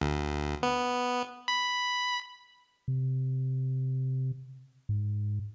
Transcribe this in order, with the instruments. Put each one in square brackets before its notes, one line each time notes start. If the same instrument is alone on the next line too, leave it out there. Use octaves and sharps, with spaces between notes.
[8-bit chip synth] D2
B3
B5
[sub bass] C3
G#2